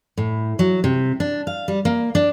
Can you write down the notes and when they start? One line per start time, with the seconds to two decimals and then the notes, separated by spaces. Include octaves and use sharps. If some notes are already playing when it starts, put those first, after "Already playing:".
0.18 A2
0.59 F#3
0.84 C3
1.20 D4
1.47 F5
1.68 G3
1.85 A#3
2.15 D4